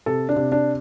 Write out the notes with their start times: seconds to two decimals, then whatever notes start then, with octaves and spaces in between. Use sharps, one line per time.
0.06 C3 A4
0.29 D4
0.36 C3
0.52 D4